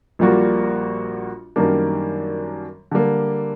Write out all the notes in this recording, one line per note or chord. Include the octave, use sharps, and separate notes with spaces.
A#1 A#2 G3 A#3 F#4
F#2 D#3 G3 A#3 D4
D3 G3 A#3